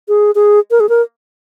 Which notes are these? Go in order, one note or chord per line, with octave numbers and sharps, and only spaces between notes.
G#4
G#4
A#4
G#4
A#4